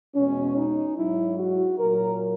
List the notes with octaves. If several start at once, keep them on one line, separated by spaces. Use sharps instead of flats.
E2 B2 G#3 C#4
D#4
G#2 F#3 E4
F#4
A#2 F#3 A#4